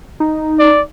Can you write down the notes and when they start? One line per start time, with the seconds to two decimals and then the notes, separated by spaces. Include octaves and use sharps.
0.20 D#4
0.59 D5